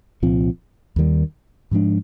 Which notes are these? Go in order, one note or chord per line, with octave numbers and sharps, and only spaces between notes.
C2 A#2 F3 C4
D#2 D#3 G3
G#2 F3 G#3 D4